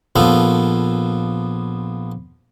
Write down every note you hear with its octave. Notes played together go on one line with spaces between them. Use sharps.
A#1 F3 B3 A4 F5